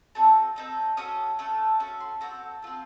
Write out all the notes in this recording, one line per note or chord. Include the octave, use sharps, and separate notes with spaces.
C4 D#4 F#4 A4 A5
C4 D#4 A4
C#4 F#4 A4 D#6
A3 C#4 A4
C#4 F#4 A4 C#6
C6
C4 D#4 F#4 A4 A#5
C4 F4 A4